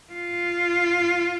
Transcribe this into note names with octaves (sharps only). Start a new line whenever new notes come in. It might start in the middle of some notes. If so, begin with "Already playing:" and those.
F4